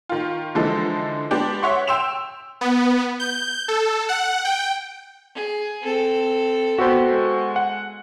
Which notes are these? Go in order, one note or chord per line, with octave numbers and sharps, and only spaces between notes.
D#3 F4
D3 E3 F3 G#3 D#4 A4
G#3 B3 D4 G4
C#5 E5 F#5 C6 C#6
G5 C6 E6 E7 F7
B3
G6
A4
F#5
G5
G#4
C4 A4
B3 F#4 G4 A4 C5
G#3
F#5